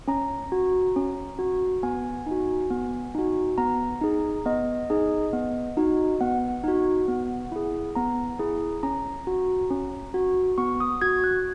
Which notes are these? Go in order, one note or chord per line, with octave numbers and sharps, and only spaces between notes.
C#4 A#5
F#4
C#4
F#4
B3 G#5
D#4 F#4
B3
D#4 F#4
B3 A#5
D#4 G#4
B3 D#5
D#4 G#4
B3
D#4 F#4
B3 F#5
D#4 F#4
B3
E4 G#4
B3 A#5
E4 G#4
C#4 A#5
F#4
C#4
F#4
B3 C#6
D#6
F#4 G#6
F#6